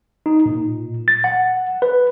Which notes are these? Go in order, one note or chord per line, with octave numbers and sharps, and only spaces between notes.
D#4
A#2
A6
F#5
B4